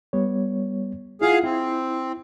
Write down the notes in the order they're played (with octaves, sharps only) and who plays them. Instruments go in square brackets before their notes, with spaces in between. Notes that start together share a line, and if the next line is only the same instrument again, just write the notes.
[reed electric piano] G3 B3 C#5
[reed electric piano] E4 F4 F#5 [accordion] G#4 F5
[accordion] C4 [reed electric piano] E4